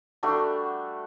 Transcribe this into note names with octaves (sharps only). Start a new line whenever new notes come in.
G3 A3 D4 F#4